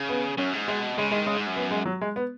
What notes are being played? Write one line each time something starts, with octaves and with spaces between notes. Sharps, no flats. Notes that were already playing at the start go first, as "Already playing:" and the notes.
Already playing: C#3
B3
F#2 C#4
G#2
B2 G#3
C#3 G#3
D#3 G#3
C#3 G#3
G#2
F#2
B3
G#3
F#3
G#3
B3